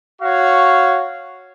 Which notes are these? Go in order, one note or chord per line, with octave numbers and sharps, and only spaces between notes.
F#4 C#5 F5 C#6